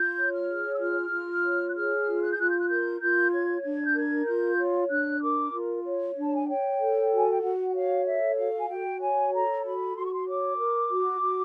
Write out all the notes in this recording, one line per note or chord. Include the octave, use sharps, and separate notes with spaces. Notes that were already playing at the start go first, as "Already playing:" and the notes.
Already playing: F4 G6
C#5
F6
G#4
E6
F4 F6
F4
C#5
F#6
G#4 F6
F4
F#6
G6
F4 F#6
G6
F#6
A#4 G6
F4 G6
C#5 G#6
D4 G#6
G6
A#4 G#6
F4 G6
C#5
D4 F#6
A#4 D6
F4
C#5
D4
A5
G#5
C#5 G5
A4
F#4
G#5
G5
F#4 F#5
C#5 F5
A4 E5
F#4 F5
G#5
F#4 G5
C#5 G#5
A4 A#5
F#4 B5
F#4 C6
C#6
C6
C#5 D6
A#4
F#4
F#4